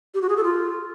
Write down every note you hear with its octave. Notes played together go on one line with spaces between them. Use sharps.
G4
F#4
G#4
A4
F4